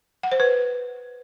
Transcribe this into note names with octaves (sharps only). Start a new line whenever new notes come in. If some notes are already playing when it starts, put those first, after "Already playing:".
F#5
C5
B4